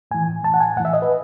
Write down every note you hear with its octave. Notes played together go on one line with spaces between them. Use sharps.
A2 E3 G#5
A2 E3 A5
F#5
G#5
A2 E3 F#5
E5
D#5
B4